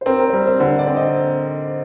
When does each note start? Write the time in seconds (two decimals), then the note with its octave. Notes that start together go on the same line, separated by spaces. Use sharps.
0.01 C5
0.06 C4 A#4
0.20 A#4
0.29 C5
0.33 G3 A#4
0.47 C5
0.60 D3 C5
0.79 D5
0.87 C4
0.97 D#5